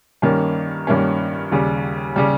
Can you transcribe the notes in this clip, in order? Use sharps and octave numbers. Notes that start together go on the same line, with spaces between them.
G2 D#3 A#3 C#4
G2 D#3 A#3 C#4
D#2 C#3 G3
C#3 G3